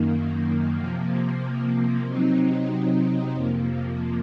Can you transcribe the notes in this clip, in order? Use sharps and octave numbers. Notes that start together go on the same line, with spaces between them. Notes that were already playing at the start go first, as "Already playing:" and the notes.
Already playing: F#2 D#3 A#3
C3 F3 A#3
C3 F#3 C4 D#4
F2 C3 F3 A#3